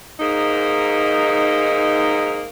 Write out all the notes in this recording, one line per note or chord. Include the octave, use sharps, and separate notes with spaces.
G#2 A#3 D#4